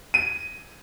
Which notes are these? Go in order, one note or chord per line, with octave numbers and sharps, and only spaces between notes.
D#7